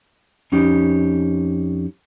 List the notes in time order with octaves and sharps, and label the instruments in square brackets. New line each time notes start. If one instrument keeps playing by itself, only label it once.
[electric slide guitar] F2 C#4 D#4 G4